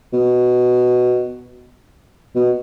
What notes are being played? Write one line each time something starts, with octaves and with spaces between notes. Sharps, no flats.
B2
B2